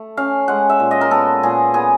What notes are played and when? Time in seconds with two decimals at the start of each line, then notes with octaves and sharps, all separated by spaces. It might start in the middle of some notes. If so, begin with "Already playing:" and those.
Already playing: A3
0.17 C#4 F5
0.48 G#3 F#5
0.69 E5
0.80 A#2
0.91 D#5
1.01 A#4
1.11 B3 A4
1.43 A#2 G#4
1.74 B3 G#4